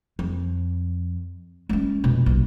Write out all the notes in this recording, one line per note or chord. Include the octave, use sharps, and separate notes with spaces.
F2
G#3 C#4
F2 B2
B1 A#2